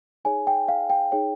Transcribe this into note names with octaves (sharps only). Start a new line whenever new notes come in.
D#4 G#4 C#5 G#5
G5
F5
G5
D#4 G#4 C#5 G5